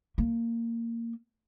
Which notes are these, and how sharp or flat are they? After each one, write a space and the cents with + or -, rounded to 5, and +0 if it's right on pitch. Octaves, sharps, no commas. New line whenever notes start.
A#3 -15